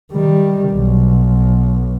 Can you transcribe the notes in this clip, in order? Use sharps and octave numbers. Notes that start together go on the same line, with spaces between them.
D#3 G3
B1